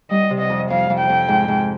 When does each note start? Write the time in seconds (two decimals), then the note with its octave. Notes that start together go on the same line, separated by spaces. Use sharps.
0.10 G3 D#5
0.30 C3
0.40 D#5
0.50 F2
0.70 F2 F5
0.90 F2
0.99 G5
1.09 F2
1.28 G#2
1.48 G#2